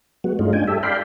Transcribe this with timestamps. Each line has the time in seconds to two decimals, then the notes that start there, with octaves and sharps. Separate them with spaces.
0.24 F#3 G#3 B3 F#4
0.39 G2 G#3 A3 C#4 D#4 F4
0.53 D4 G5 G#5
0.67 G4 A4 E5
0.83 D5 F5 G5 B5 C6